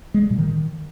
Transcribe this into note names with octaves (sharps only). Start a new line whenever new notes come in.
G#3
G3
A#2
D#3